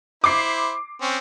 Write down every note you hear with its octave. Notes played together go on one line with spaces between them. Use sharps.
E4 C5 D6 C7
C4 C#4